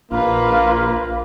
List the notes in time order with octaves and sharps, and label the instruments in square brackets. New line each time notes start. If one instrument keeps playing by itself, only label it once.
[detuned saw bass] A#1 [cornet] A#3 [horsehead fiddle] F4 B4